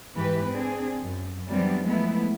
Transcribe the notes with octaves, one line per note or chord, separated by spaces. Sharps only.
G#2 E3 G4 B4
C4 D4 G#4
F#2
E3 F#3 G3 B3 C4 D4
F3 G#3 A3 B3 E4